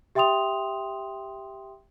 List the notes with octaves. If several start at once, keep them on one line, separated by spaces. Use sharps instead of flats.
G4 E5 G5 C6 D#6 F7